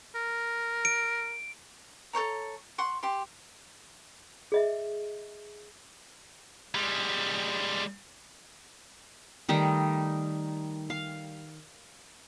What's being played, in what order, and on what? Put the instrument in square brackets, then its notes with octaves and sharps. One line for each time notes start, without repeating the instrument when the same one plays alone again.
[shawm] A#4
[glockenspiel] D7
[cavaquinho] A4 C5 C#5 A#5
F#5 C6 C#6
G4 C6
[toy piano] G#4 D#5 E5
[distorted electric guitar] G3 G#3
[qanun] D#3 G3 A3 D#4
F5